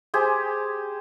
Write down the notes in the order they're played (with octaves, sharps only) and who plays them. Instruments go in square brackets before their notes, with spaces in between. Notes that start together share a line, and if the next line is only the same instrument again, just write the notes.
[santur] G4 G#4 C5